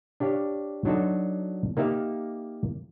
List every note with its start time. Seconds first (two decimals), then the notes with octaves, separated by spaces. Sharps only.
0.20 D4 G4 C#5 F5
0.85 F#3 D4 D#4 F#4 A4
1.77 A#3 D#4 G4 E5 F5